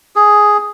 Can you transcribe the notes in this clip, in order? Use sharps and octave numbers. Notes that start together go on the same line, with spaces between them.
G#4